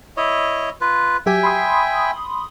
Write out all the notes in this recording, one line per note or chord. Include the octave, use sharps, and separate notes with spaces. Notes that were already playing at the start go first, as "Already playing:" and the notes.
E4 C#5 D#5
F4 B4
F#3 G4 E5 G5 G#5
B5 C6 D#6